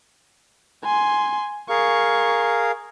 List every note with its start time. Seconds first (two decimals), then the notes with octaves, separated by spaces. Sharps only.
0.84 G#5 C6
1.69 G#4 A#4 F5 C#6